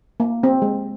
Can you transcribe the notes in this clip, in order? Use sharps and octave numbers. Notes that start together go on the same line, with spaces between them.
A#3
C4
G#3